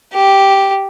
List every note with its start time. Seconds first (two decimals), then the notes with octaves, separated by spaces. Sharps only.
0.14 G4